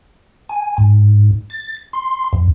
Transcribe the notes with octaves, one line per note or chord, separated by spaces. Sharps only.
G#5
G#2
A6
C6
F2